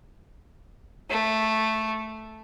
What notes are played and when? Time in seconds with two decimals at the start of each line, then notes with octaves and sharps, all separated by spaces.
1.10 A3